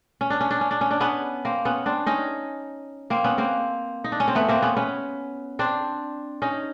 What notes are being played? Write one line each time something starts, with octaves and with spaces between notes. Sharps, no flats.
C#4
D4
C#4
D4
C#4
D4
C#4
D4
B3 C#4
A#3 C4
B3 C#4
C4 D4
C#4 D#4
A#3 C4
B3 C#4
A#3 C4
D#4
D4
C#4
C4
A3 B3
A#3 C4
B3 C#4
B3 C#4
C4 D4
C#4 D#4